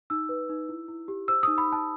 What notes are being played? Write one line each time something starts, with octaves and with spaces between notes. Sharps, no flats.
D#4 E6
B4
D#4
E4
E4
G4
C5 E6
D#4 D#6
B5
D#4
A5